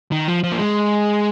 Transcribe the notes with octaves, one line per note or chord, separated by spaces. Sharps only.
D#3
F3
F3
A#3
G#3